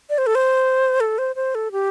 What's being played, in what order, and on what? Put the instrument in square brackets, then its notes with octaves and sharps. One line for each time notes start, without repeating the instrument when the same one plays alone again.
[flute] D5
C5
A4
C5
A4
C5
C5
A4
G4